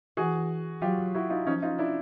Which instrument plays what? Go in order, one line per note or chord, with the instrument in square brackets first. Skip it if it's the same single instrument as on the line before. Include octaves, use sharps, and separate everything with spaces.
[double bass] E3 [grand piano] F#4 G#4
[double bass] F#3 [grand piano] F4 G4
[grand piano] E4 F#4
D#4 F4
[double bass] F3 [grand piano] C#4 D#4
[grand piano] D#4 F4
D4 E4